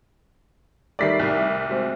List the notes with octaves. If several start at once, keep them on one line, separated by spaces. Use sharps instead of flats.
D#3 G3 A3 D5 B6 C7
C2
G#3 C4 F#4